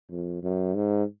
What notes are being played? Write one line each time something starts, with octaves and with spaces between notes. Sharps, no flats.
F2
F#2
G#2